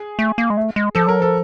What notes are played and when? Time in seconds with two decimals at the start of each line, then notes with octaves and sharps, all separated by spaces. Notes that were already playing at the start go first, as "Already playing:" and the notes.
Already playing: G#4
0.19 A3
0.38 A#3
0.50 G#3
0.57 A3
0.76 G#3
0.95 F3 A4
1.07 F#3 A#4
1.20 F3 A4